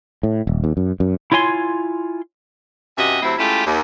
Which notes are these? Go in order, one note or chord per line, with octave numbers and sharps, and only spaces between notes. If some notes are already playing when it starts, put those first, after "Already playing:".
A2
D#1
D#2
F#2
F#2
E4 F4 C#5 G#5 C6
G2 C3 C#4 F#4 D#5 E5
C3 F#3 A3 C4 E4
G#3 A3 C#4 E4 F4 G4
D#2